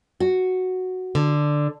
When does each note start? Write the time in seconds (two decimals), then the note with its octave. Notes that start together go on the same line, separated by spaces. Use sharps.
0.20 F#4
1.15 D3